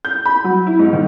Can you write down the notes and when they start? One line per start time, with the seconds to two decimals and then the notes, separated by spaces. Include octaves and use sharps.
0.05 G6
0.25 B5
0.44 F#3
0.67 E4
0.79 G#2
0.93 D#3